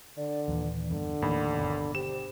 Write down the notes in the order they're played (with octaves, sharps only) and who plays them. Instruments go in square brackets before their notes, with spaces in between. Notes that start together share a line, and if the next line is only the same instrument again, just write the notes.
[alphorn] D3 [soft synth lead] D5
[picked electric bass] D#2 A#2 [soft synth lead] E3
[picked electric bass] E2 G2 [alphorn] D3
[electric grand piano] D#2 [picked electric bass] A2 E3 [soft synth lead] B5
[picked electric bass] G1 B2
[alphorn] G4 [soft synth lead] C5 [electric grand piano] E7